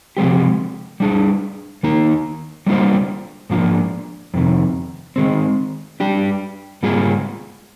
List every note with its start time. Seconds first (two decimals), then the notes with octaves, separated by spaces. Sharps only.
0.17 C3 F3 G#3 C4 G4
1.00 G3 D4 G#4
1.83 D#3 A#3 D#4 A#4
2.67 G3 A#3 D4 F4 C5
3.50 G#2 F3 A#3 D4 F4
4.34 F2 C3 D#3
5.16 D#3 G#3 C4
6.00 G3 D4 G4
6.83 G#2 G3 A#3 F4 G#4